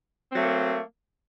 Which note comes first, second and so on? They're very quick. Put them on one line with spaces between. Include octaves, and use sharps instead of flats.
C4 F#3 A3 A#3